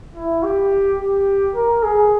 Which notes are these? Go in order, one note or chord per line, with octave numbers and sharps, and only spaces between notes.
E4
G4
G4
A#4
G#4